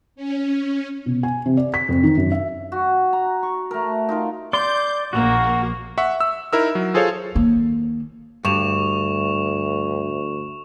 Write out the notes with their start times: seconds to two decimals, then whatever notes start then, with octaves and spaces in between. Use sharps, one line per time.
0.16 C#4
1.06 B2
1.23 G#5
1.46 C3
1.57 D5
1.74 B6
1.89 F2
2.03 D#3
2.17 F#2
2.32 E5
2.72 F#4
3.13 A#5
3.43 C#6
3.71 A3 A#4
4.09 D#4 F4 A#4
4.53 D5 C6 G6
5.13 A#1 A#3 F#4
5.98 E5 F#5 C#6
6.21 E6
6.53 D#4 E4 A#4 E6
6.75 F#3
6.94 F4 G#4 A4 C5 C#5 F5
7.35 D#3 A#3
8.45 D2 G2 C#6 E7 F7